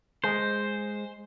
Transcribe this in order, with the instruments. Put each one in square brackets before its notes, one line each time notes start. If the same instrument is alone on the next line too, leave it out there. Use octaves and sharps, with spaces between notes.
[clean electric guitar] G#3 G#4 [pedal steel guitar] C5